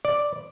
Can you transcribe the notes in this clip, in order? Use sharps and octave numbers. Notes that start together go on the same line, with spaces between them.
D5